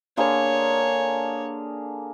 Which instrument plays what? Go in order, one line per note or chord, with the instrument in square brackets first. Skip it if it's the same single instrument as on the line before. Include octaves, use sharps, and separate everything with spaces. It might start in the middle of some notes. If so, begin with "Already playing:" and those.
[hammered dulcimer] D3 A#3 G#4 [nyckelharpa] C#5